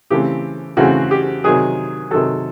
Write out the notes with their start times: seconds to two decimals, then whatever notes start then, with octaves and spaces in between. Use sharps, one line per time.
0.10 C#3 E3 A3 C4 G4
0.77 C#3 E3 A3 C4 F#4
1.11 G4
1.44 C3 D#3 F#3 G#4
2.11 C3 D#3 F#3 A4